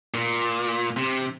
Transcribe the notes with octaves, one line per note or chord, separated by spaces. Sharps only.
A#2
C3